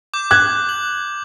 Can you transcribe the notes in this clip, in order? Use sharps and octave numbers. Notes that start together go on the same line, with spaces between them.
D6 G6
D6 F#6 G#6
F#7